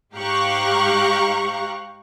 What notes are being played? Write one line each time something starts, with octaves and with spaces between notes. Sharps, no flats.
G#2 G4 F5 A#5 C#6 F#6